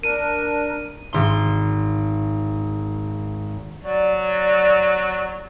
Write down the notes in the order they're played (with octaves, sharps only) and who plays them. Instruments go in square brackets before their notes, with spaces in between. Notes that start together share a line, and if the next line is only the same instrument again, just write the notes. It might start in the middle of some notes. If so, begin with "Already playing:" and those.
[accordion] D4 A#4 [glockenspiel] D#7
[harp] G#1 C6
[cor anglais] F#3 [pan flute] D5